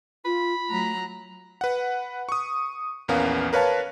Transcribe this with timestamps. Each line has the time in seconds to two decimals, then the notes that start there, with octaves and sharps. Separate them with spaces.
0.25 F4 B5
0.69 F#3 A3 A#5 F#6
1.61 B4 F#5
2.29 C#6 D#6
3.08 A#1 E2 B3 C#4 A#4 F5
3.53 A#4 B4 C#5 F5 A5